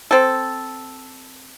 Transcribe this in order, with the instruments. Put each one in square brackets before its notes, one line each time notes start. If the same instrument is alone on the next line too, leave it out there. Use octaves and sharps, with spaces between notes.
[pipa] C4 A4